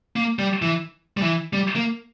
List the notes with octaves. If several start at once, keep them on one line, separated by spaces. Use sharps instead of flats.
A#3
G3
E3
G3
E3
G3
A#3